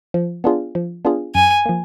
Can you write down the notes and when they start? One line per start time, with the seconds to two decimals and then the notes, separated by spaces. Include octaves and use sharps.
0.14 F3
0.44 B3 D4 F4 G#4
0.75 F3
1.05 B3 D4 F4 G#4
1.34 F#2 G#5
1.66 F3 A#3